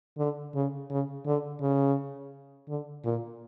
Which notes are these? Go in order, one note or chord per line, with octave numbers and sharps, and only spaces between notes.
D3
C#3
C#3
D3
C#3
D3
A#2